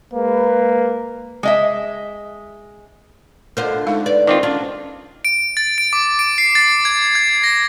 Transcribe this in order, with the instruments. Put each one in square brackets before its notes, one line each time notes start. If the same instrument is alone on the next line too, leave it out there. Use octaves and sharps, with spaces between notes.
[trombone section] G#3 B4 [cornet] A#3
[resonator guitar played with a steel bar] G#3 D#5 E5
[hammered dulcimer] B2 D3 D4 [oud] F4 C5 [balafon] A#4
[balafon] G#3 D#4 F5 [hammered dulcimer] A3
[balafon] B4 [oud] D5
[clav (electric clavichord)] D#3 C4 F4 [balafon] D6
[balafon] C#4 [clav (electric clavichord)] D4 [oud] F4
[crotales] D7
A6
D7
D6
D7
C7
A6
G#6
G#6
A#6